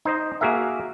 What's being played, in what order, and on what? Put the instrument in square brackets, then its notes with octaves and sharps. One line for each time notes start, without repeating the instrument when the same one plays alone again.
[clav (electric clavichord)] D#4 C5 D#5
A#3 F#4 G#4 A#4 E5